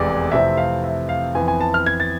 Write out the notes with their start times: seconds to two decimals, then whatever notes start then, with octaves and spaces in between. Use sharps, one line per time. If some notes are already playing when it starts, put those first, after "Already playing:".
Already playing: F1 E2 C3 G#3 B3 D5
0.32 F2 C3 E3 A3 C4 E5
0.57 F5
0.84 E5
1.09 F5
1.35 F2 E3 B3 G#5
1.48 G#5
1.61 A5
1.74 F6
1.86 G#6
2.00 A6